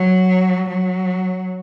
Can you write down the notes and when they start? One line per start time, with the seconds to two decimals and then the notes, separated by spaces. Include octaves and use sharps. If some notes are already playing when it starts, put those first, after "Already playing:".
Already playing: F#3
0.70 F#3